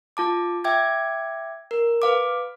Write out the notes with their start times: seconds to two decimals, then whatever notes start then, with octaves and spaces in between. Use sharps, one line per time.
0.17 F4 A5 D6
0.64 E5 G5 D6 G#6
1.71 A#4
2.02 B4 F5 D6